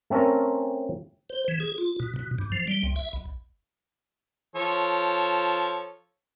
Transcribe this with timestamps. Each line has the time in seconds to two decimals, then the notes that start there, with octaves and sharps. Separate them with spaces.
0.10 A3 C4 C#4 A4 A#4
1.30 C5
1.48 E3
1.60 G#4
1.78 F4
2.00 B2
2.16 B2
2.39 G2
2.52 F3
2.67 G3
2.83 C2
2.96 E5
3.13 B1
4.56 F3 A4 C#5